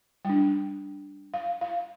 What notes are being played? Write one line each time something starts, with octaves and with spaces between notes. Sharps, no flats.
G3 D4 G5
F5
F5